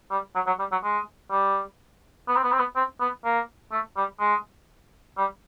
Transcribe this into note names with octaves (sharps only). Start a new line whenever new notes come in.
G3
F#3
F#3
G3
F#3
G#3
G3
B3
C4
B3
C4
B3
C4
B3
A#3
A3
G3
G#3
G3